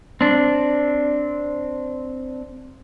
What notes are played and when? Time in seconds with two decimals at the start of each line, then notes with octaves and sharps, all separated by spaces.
0.21 C4 D4